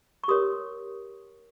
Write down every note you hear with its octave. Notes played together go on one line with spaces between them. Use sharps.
C#6
G4 A#4 C#5 C6 D#6